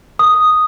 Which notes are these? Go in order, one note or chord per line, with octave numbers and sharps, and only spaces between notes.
D#6